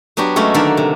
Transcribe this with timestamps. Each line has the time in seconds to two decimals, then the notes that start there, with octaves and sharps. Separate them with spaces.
0.17 F#3 B3 D4 F#4 G4
0.36 F#3 G#3 A3 C#4 A4
0.54 D3 D#3 A#3 A4 D5 E5
0.77 C3